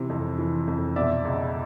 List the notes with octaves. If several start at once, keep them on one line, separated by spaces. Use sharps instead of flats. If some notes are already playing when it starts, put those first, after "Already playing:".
Already playing: C3 E3
F2
E3
F2
B2 D5 E5
C#2